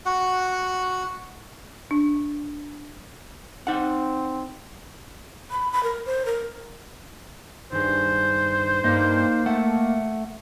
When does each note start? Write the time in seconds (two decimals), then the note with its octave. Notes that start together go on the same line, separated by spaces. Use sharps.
0.06 F#4 F#5
1.91 D4
3.67 C4 D#4 F#5
5.51 B5
5.72 B5
5.83 A#4
6.06 C5
6.26 A#4
7.72 G2 D#3 G#4 C5
8.84 G2 A#3 D#4 D#5
9.46 A3 F#5